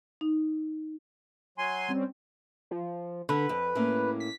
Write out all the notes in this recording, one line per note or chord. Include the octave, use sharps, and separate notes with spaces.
D#4
F#3 G#5 C6
G3 C4 C#4
F3
D3 B4
F2
A2 A#3 C#4
B6